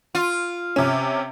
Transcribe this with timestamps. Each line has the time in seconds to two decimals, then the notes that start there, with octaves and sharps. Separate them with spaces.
0.15 F4
0.76 C3 C#4